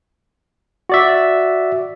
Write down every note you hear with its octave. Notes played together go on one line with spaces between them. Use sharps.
F#4 D5 E5